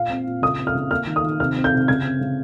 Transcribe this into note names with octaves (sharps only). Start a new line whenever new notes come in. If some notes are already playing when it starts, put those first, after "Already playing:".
Already playing: A#2 F5
C4
A#2
C#3 D#6
C4
F6
C#3
A#3 F6
D#3
D#6
D#3
C3 F6
C4
G6
C3
C#3 G#6
C4
C#3